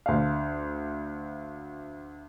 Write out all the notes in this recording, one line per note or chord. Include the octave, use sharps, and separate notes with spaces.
D2 F5